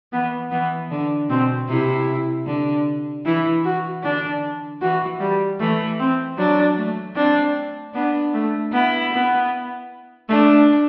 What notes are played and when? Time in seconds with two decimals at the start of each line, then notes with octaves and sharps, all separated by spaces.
0.13 E3 B3
0.51 E3 B3
0.91 D3
1.29 B2 C4
1.69 C3 E4
2.47 D3
3.25 E3 E4
3.65 F#4
4.04 D3 D4
4.81 E3 F#4
5.21 G3
5.60 E3 A3
5.99 C4
6.38 F#3 D4
6.77 A3
7.16 C4 D4
7.94 B3 D4
8.34 A3
8.73 B3 E4
9.12 B3
10.29 A3 D4